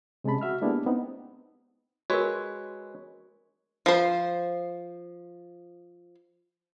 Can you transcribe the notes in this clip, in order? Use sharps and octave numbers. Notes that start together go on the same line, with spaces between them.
C3 G#3 C#4 A5 B5
F#4 E5 F6
G#3 A#3 B3 D4 E4 G4
B3 C4 D#4
G#3 F#4 A#4 B4 C#5
F3 C5